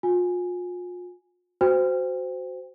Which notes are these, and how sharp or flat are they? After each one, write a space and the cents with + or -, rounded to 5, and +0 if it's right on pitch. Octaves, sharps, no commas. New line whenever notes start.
F4 +40 G#5 +0
F#4 +0 C5 -20 G5 +25